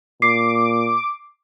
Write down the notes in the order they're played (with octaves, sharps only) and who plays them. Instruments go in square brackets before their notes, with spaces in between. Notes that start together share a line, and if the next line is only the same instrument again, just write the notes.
[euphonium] A#2 [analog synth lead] D6 [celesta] C7